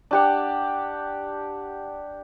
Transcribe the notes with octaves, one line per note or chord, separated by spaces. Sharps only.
D4 G4 F#5